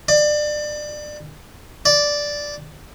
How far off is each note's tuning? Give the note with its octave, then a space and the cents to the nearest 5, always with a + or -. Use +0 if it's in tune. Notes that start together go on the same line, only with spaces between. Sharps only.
D5 +25
D5 -5